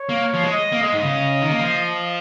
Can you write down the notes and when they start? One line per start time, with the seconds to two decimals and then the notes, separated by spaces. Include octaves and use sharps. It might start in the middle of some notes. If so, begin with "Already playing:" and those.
Already playing: C#5
0.09 A#3
0.34 F3
0.43 G#3
0.52 D#5
0.72 A#3
0.82 G#3 D#5
0.92 G#2
1.02 C#3
1.41 D#3
1.51 A#3
1.61 F3